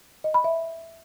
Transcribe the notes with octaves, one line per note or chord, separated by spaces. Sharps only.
D#5
B5
E5